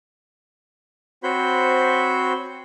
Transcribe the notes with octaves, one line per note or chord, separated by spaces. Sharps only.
C4 F#4 C5 C#5 B5 G6